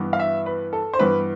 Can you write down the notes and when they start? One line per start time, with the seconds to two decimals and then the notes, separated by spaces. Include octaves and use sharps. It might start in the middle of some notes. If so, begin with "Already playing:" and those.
Already playing: G2 E3 B3
0.13 F5
0.19 E5
0.46 B4
0.73 A4
0.94 C5
0.99 G2 E3 B3 B4